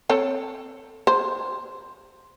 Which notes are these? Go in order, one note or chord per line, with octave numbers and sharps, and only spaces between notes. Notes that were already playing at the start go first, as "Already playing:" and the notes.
C4 A4 C#5
C5